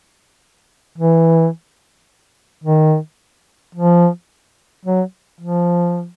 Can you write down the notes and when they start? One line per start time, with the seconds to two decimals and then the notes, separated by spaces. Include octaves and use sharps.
0.98 E3
2.64 D#3
3.75 F3
4.85 F#3
5.41 F3